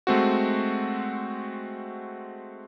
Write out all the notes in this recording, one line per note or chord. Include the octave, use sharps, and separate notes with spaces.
G#3 A3 C4 F#4